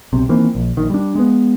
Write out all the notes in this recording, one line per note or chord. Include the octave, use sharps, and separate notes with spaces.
B1 C3
D#3 E3 A#3 C4
A#1
A#1 D#3
G3 D4
G#3 B3